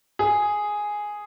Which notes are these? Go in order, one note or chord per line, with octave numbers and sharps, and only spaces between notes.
G#4